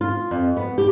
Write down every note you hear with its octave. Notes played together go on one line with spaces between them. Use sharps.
F4
F2
B3
G4